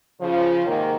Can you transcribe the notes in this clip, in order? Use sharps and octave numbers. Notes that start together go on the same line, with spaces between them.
C#3 F3
G#2 C3 D#3 A#3